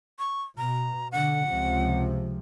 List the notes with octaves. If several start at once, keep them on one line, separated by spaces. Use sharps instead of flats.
C#6
B2 A#5
D3 F#5
C#2 C3 F3